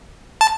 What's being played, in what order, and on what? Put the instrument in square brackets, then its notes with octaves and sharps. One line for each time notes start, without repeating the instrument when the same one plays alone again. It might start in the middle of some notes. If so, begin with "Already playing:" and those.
[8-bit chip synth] A5